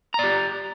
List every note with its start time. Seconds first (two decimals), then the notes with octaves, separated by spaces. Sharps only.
0.14 A#5
0.19 D5
0.24 G4